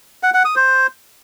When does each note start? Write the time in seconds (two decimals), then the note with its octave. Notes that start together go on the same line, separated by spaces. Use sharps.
0.23 F#5
0.34 F#5
0.45 D#6
0.56 C5